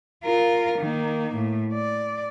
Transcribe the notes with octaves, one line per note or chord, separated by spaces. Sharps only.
F4 A#4
D#3 A#3
A2
D5